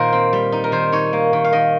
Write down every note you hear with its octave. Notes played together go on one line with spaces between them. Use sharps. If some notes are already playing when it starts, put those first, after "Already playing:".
Already playing: A#2 D#3 A#3 A#4 C5
C4
G3
D#4
A#4
D#3 C5
D#4 C#5
A#3
D#3
F5
D#3 D#5